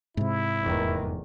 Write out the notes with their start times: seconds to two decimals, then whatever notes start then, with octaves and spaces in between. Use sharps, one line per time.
0.17 G#2 C3 E4
0.63 F1 E2 D#3